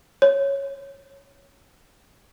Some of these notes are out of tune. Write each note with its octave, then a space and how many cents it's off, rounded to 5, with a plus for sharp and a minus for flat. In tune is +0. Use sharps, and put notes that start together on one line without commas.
C#5 -5